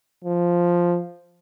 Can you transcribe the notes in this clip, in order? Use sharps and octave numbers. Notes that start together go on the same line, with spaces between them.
F3